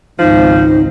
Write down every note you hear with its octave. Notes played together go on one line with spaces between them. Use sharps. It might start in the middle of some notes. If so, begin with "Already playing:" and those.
G#1 C#2 F3 C4 D#4